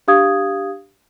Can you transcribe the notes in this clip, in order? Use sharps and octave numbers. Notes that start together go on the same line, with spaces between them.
D4 G4 F5 D#6 G#6